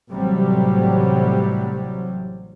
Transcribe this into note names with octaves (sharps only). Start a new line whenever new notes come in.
A1 C3 F#3 G3